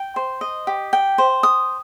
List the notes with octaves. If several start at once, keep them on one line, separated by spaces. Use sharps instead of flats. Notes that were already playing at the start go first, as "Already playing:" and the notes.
Already playing: G5
C5
D#5
G4
G5
C5
D#6